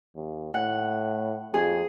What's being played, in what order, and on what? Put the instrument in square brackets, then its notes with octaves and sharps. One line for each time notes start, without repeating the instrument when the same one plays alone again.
[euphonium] D#2
[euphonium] A2 [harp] F#5
[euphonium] F2 [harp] G#4